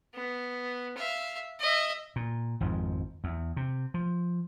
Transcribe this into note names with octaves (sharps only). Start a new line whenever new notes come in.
B3
E5 F5
D#5 E5
A#2
G#1 F2 G#2 F3
E2
C3
F3